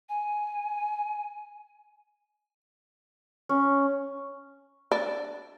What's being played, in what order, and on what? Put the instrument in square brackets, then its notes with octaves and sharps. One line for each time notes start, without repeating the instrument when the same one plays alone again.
[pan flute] G#5
[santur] C#4
[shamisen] D4